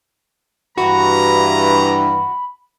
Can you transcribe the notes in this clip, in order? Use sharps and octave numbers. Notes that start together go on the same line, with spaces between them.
G2 E3 F#4 A#5 B5